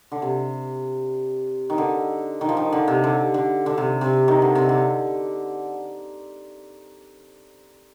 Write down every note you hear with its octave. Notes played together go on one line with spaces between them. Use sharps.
D3
C3
D#3
D3
D#3
F3
D#3
D3
C3
D3
D3
D3
C3
C3
D#3
D3
C3
D3